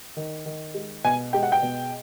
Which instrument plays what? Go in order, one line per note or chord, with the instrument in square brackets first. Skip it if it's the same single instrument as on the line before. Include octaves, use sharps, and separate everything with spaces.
[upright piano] D#3
D#3
G#3
B2 G#5
G#3 G5
F#5
G5
B2